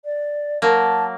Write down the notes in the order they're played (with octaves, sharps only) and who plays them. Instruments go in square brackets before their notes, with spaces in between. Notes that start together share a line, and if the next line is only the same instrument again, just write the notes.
[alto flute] D5
[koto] F#3 A#3 [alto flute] A5